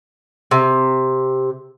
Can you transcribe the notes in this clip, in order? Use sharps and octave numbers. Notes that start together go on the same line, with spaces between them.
C3